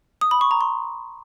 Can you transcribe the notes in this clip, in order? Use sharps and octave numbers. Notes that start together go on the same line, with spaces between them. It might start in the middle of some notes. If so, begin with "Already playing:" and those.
D#6
B5
C#6
A#5
C6